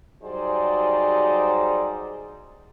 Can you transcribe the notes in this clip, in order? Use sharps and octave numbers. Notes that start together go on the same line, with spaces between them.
F#3 G3 D#4 G#4 C5 D5